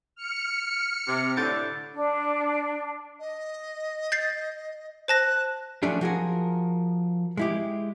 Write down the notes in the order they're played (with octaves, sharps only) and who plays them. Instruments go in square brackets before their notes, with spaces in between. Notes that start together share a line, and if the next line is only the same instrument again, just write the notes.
[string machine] F6 C#7
[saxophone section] C3
[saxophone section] A2 D3 [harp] G6 A6 D7
[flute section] D4
[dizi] D#5
[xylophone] G6 A6 C7
[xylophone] C5 A5 A#6 [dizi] F#6
[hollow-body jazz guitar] F3 F#3 A3 C#4 D4 G4
F3 F#4 G#4 A#4
G#3 E4 G4